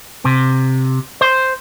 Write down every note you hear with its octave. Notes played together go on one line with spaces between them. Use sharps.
C3
C5